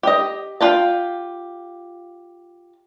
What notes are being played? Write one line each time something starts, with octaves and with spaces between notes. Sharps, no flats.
G4 D#5
F4 G4 A5